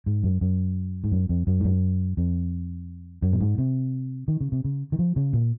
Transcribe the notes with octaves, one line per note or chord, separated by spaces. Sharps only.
G#2
F#2
F#2
G#2
F#2
F2
F#2
G#2
F#2
F2
F#2
A#2
G#2
C3
D#3
C#3
C3
C#3
D#3
F3
C#3
A#2